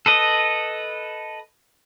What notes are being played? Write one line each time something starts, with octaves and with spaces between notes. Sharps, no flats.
A4 B4 D#5